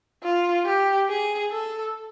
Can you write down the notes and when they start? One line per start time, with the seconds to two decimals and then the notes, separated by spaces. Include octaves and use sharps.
0.23 F4
0.65 G4
1.09 G#4
1.51 A4